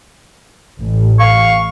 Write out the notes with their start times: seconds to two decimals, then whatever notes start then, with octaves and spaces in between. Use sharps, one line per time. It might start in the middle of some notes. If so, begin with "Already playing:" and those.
0.79 A1
1.20 F5 C#6